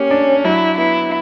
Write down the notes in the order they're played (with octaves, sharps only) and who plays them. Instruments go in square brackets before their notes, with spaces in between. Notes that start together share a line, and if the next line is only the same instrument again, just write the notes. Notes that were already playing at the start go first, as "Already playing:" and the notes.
Already playing: [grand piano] A#3 G4 [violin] C#4
[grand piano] D4
[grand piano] F#3 [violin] E4
[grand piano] B3 [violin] E4